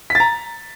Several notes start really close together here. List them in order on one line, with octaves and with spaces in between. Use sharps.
B6 A6 A#5